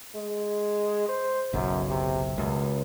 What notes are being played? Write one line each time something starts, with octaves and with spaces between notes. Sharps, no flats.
G#3
C5
F#1 B1 F#2
C3
C#2 F#2